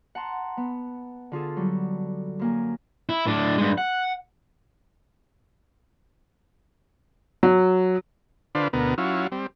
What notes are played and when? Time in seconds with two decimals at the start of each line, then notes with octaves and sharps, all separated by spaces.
0.15 F#5 A5 A#5 C6
0.57 B3
1.32 D3 F4 G#4 A4
1.57 F#3 G3
2.39 F#2 A#3 G#5
3.09 E4
3.26 A2 D4
3.58 G2 G#3
3.78 F#5
7.43 F#3
8.55 D3 D4 F4 B4 C5
8.73 D2 B2 B3 A#4
8.98 F#3 C#4 E4 F4
9.32 G3 C4